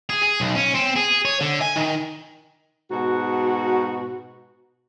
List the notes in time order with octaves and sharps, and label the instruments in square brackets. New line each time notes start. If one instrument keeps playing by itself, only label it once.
[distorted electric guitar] G#4
G#4
B1
C#4
C4
G#4
C#5
D3
G#5
D#3
[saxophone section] G#2 B2 F#4